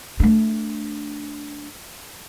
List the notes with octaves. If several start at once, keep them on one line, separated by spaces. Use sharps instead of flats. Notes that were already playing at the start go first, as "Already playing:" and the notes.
A3 D4